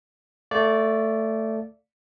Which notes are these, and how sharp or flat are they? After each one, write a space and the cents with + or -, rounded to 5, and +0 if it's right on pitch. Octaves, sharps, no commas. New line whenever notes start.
A3 +10 D5 -10 F5 +0